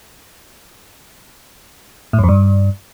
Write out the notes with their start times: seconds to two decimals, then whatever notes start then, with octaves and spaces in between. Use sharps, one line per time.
2.13 A2
2.18 F#2
2.23 F2
2.29 G2